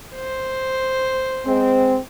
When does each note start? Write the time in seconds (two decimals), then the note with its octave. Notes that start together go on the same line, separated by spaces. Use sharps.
0.15 C5
1.46 G#3 C4